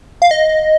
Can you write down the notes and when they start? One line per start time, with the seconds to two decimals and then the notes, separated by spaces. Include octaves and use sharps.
0.22 F5
0.31 D#5